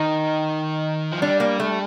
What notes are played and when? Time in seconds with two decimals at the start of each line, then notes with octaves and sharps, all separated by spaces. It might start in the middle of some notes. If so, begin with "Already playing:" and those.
Already playing: D#3 D#4
1.12 F3
1.22 G3 D4
1.40 A#3
1.60 A3